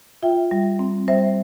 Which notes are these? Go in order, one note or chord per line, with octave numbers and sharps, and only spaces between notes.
F4 E5 G5
G3
C4
G3 C5 E5